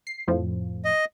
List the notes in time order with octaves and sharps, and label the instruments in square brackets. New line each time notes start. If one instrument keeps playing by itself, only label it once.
[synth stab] C7
F2 A2 F3
[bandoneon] D#5